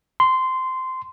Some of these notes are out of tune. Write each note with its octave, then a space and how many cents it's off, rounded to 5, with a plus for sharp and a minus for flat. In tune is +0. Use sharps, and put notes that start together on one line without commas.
C6 -15